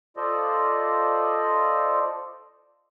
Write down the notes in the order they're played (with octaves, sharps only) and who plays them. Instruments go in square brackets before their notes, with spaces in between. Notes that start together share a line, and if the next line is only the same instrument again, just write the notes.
[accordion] F4 A4 C5 D5 D#5